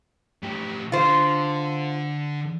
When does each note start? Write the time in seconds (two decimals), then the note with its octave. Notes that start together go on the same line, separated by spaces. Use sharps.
0.43 A2 G4
0.92 D3 F4 C5